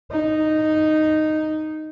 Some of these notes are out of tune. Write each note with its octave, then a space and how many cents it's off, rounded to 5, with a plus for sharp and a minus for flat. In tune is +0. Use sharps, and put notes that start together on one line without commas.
D#4 -5